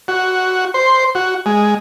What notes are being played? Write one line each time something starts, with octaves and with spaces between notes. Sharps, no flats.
F#4
C5
F#4
G#3